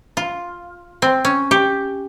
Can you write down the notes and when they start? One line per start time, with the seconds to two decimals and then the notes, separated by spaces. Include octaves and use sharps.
0.17 F4
1.02 C4
1.25 C#4
1.51 G4